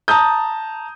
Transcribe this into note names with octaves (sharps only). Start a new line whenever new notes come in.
A5 A#5 D#6 G6